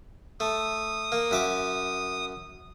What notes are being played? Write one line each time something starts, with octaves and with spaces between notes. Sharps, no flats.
A3 D#6
A#3
F#2 E5 D6